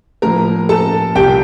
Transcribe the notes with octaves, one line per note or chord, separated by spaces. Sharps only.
A2 F3 A#3 A#4 A#5
A4 A5
C2 A#2 G3 G4 G5